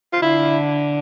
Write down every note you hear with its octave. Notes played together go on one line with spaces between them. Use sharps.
F4
D3 E4